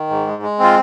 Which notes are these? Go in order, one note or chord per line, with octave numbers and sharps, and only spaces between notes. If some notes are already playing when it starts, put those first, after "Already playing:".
Already playing: D#3
G#2
G#3
G#3
C4 F4